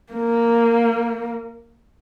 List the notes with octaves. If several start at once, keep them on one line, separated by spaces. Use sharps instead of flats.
A#3